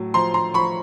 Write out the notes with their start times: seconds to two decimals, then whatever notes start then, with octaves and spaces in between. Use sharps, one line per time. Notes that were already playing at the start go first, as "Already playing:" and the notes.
Already playing: A2 F#3
0.14 F3 A#5 C6
0.34 A#5 C6
0.54 F3 B5 C#6